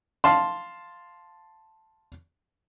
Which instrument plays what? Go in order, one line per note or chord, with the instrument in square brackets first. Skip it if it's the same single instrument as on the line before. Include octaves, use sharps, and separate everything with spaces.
[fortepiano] F5 A5 C6